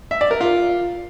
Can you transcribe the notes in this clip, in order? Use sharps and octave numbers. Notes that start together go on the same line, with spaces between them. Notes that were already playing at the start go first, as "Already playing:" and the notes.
E5
D5
A#4
F4